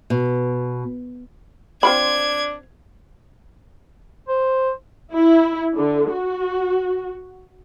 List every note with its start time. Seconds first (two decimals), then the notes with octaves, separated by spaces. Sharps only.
0.10 B2
1.83 C4 D4 F4 B5 G#6
4.28 C5
5.14 E4
5.76 D3
6.12 F#4